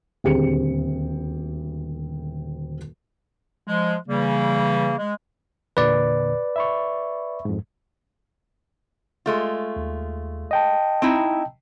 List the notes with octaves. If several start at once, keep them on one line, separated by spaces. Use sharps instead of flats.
D#1 D2 C4 G4 G#4 C#7
F3 G#3
C#3 E3 G3 A#3
G#3
E2 A#2 D3 B4 D5
E5 B5 C#6
F2 G#2
G#3 A3 F4
D#2
D#5 G5 A5
C4 D#4 E4